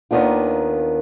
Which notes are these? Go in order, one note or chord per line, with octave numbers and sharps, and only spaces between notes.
D#2 D#3 B3 D4 F4